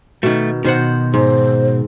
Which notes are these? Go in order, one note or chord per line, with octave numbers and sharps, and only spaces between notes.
B2 D#3 A3
B2 D#3 C5 F#5
G#2 C5